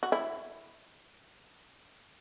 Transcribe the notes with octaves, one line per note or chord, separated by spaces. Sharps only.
F#4
E4